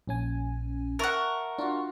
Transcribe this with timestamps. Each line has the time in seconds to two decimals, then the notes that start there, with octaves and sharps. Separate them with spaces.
0.07 A#1 C#4 G#5
0.99 A#4 E5 F#5 A5 C#6
1.58 D4 F4 F#4